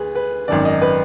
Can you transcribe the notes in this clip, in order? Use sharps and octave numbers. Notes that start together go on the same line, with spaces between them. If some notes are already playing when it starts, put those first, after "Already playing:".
Already playing: D2 G#4 B4
B4
G#1 F#2 D#3 D5
D#5
B4